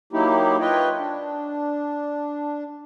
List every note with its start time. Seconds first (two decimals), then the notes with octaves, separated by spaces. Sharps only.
0.13 F#3 A#3 D#4 E4 G4
0.60 F4 B4 C#5 D#5 G5
0.99 D4